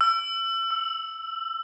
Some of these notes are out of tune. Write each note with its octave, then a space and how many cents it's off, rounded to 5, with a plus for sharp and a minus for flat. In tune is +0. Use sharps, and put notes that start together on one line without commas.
E6 +35
E6 +5